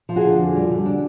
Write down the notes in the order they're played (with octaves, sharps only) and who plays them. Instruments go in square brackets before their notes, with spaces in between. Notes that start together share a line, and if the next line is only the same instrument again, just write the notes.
[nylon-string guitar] F3
F#4 G#4
D3
F2
G3
D3
D4